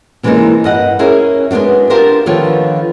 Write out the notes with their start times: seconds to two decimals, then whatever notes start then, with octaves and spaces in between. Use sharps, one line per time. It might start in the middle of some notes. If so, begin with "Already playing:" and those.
0.23 C3 E3 G#3 A#3 C#4 D#4
0.64 G2 D#5 F#5
0.99 C#4 E4 G#4 A#4
1.51 G#3 B3 C#4 D4 F#4
1.90 D4 F4 G4 A#4 C5
2.26 D3 D#3 F3 B3 F4 C#5